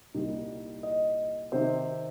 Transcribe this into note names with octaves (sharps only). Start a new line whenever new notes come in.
C2 A#2 G3 D#4
D#5
C3 D#3 C4 D#4 C5